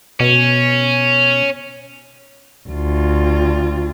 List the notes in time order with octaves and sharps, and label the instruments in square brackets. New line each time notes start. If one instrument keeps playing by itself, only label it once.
[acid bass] B2 [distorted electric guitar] C#4
[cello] D2 F4